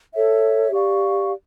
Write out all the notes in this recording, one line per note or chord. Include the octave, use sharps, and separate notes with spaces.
A4 C#5 E5
G4 D5 F5 C#6